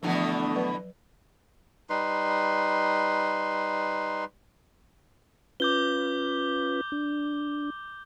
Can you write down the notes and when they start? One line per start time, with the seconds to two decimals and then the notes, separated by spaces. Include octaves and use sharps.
0.03 B2 D3 E3 F3 A3 B3 D4 F#5
0.55 F#3 B4 D5
1.90 G3 D#4 B4 C6
5.60 C#4 F4 B4 D6 G6 G7
6.92 D4